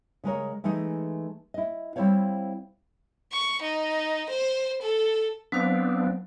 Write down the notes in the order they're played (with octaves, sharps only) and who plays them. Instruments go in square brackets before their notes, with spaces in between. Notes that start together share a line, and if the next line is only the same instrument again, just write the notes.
[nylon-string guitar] C#3 G#3 A#4 C#5
E3 G#3 A3 D#4
E4 D#5
G3 C4 E4 C5 C#5 F5
[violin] C#6
D#4
C5
A4
[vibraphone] F#3 C5 F5 [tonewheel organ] B3 C4 D4